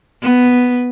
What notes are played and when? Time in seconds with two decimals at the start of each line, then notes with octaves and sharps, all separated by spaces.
0.23 B3